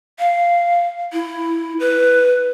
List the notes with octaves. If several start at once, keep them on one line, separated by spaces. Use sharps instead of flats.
F5
E4
B4